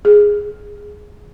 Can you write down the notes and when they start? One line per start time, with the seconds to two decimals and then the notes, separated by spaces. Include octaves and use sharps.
0.05 G#4